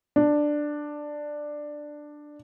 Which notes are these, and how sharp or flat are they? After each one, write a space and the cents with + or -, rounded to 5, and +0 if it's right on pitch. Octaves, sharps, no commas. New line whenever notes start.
D4 +10